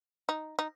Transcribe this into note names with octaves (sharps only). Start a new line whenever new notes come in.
D#4
D#4